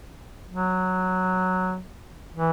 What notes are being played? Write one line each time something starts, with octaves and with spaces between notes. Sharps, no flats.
F#3
E3